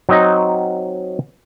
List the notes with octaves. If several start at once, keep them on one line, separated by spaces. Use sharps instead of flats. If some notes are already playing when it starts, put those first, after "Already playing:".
F#3 C4 D#4 D#5